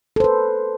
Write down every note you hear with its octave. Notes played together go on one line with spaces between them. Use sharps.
A4 B4 C5